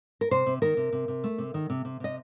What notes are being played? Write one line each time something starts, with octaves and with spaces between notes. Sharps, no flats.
A#4
C3 C5
C3
D#3 A#4
C3
C3
C3
A3
C3
D#3
C3
C3
C3 D#5